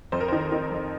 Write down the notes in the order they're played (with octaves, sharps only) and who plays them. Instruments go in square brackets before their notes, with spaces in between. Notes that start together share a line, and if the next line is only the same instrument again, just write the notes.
[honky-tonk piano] F2 C5
A#4
D#3 C5
D#3
F2